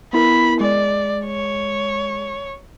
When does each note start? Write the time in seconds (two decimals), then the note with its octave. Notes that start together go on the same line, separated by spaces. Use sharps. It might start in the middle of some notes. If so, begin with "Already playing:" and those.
0.13 B3 E4 A#4 B5
0.60 G#3 D5
1.26 C#5